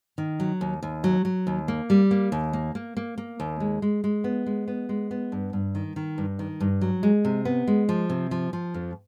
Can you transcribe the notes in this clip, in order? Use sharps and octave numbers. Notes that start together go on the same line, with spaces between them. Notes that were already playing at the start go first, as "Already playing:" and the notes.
D#3
F#3
D#2
D#2
F#3
F#3
D#2
A#3
G3
A#3
D#2
A#3
A#3
A#3
A#3
D#2
G#3
G#3
G#3
B3
G#3
B3
G#3
B3
G2
G2
D#3
D#3
G2
D#3
G2
F#3
G#3
C3
B3
G#3
F3
C3
F3
F3
F2